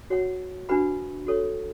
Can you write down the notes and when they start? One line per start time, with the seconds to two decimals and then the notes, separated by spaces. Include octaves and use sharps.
0.10 F#4 C#5 F#5
0.69 D4 F#4 B4 F#5 B5
1.27 F#4 A4 C#5